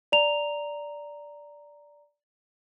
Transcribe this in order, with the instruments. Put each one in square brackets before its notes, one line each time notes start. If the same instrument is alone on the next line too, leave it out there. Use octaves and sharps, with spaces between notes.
[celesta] D5 A#5 F7